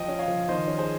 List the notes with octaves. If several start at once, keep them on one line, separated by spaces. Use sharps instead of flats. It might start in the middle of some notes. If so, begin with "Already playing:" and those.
Already playing: F3 D#5 G5
C#4
C#5 F5
F3
D#3 C5 D#5
C#4
G#4 C5